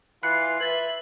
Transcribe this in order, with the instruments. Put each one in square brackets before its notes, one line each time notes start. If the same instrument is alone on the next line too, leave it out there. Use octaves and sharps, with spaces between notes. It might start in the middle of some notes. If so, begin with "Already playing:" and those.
[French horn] E3 [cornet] F4 [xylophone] B5 F#6 C#7 [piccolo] C7
[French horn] B4 [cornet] E5 [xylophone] G#6 A6 [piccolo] F#7